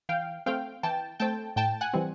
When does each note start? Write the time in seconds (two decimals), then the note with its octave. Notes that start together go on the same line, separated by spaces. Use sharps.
0.09 E3 F5 G5
0.46 A3 C4 F5 G5
0.83 E3 G5 A5
1.19 A3 C4 G5 A5
1.56 A2 G5 A5
1.81 F#5 G#5
1.93 E3 G3 C4